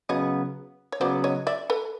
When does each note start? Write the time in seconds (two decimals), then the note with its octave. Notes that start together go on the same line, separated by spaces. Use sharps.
0.09 C#3 F#3 B3 C#5 D#5
0.92 C#5
1.00 C#3 F#3 B3 C5 D5
1.24 C#5 D#5
1.47 D5 E5
1.70 A4 B4